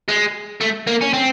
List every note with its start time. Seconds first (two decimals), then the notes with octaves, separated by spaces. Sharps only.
0.09 G#3
0.61 A3
0.87 A#3
1.01 C#4
1.13 C4